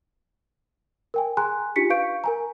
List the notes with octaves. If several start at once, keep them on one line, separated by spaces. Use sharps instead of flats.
A#4 G5 G#5
G#4 G#5 A#5 C6 F#6
D4 D#4 F4 G4 B6 C#7
B4 F5 C#6 G6 D7
A#4 G#5 A#5